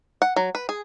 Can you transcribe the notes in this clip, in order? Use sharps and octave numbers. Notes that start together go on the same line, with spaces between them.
F#5
F#3
B4
G#4